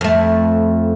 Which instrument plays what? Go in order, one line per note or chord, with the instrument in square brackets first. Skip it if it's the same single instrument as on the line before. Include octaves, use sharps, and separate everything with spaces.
[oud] F2 A3